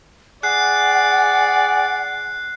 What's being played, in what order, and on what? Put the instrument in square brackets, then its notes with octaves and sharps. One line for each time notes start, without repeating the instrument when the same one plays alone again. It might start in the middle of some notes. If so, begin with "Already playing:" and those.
[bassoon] G#4 [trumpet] D5 [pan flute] F#5 [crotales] F#6 C7